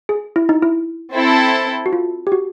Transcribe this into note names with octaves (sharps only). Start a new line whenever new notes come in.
G#4
E4
D#4
E4
C4 E4 A4
F#4
F4
G4
F#4